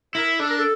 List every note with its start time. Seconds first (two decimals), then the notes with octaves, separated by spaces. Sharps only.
0.14 E4 A#4
0.40 D4 A4
0.49 A#4
0.58 A4